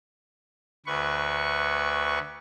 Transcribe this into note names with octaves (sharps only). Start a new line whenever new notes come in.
D2 B4 C#6